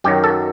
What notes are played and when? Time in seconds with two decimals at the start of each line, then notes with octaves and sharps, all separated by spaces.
0.04 F#2 D#3 F#3 G4
0.24 A4